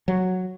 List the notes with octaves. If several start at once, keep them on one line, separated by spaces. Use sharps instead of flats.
F#3